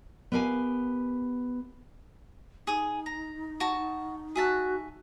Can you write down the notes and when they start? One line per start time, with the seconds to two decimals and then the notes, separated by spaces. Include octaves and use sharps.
0.32 B3 G4 A#4 F5 G#5
2.67 D#4 G#4 D#6
3.06 A#5
3.60 F#4 A5
4.35 F#4 G#4 E5 A5